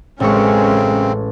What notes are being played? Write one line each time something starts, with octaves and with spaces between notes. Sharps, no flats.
A1 F#2 C#3 G#3 C4 C#4 C#6